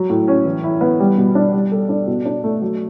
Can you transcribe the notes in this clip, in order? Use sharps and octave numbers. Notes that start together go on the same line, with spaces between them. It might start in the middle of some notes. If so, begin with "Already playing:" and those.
Already playing: F#3
A2
C#4
E3
E4
B3
G3
B2
D4
G3
A4
D4
B2
D4
A3
F#3